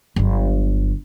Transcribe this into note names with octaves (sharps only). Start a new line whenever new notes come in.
G1 F#3